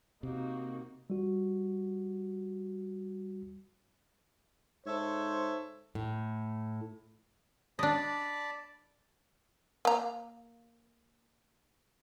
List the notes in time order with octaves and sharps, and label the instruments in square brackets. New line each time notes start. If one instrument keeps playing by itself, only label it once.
[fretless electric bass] C3 [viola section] A#3 D#4 F#4
[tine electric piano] G3 F#4
[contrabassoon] G#2 [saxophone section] A4 C#5 E5 [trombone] C5
[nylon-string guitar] A2
[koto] D4 D#5 [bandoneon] D5 A5 B5
[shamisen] A#3 A#5